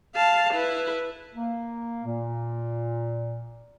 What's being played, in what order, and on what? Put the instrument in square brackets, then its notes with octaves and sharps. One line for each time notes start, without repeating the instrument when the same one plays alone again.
[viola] F5 A5
E4 B4
[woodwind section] A#3
A#2